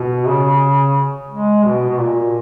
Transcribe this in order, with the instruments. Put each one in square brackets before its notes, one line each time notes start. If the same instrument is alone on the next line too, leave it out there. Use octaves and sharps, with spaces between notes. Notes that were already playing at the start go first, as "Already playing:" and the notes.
Already playing: [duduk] B2
C#3
G#3
B2
B2
A#2